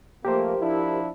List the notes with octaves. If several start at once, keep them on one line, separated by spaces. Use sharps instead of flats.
F3 A3 A#3 G4 A#4 C5
F3 D4 E4